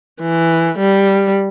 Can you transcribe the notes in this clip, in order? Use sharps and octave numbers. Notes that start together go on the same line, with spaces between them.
E3
G3